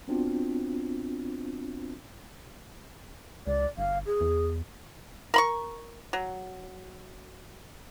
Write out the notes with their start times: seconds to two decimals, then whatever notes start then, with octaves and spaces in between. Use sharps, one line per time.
0.08 B3 C4 D4 F4 F#4
3.47 C#2 D5
3.78 G1 F5
4.06 G#4
4.21 E2
5.34 A#4 B5 C#6
6.13 F#3